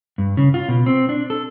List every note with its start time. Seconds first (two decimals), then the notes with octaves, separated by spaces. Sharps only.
0.18 G2
0.37 C#3
0.54 F4
0.69 B2
0.86 C4
1.09 D4
1.30 A4